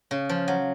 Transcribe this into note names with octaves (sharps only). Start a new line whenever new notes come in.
C#3
F3
F#3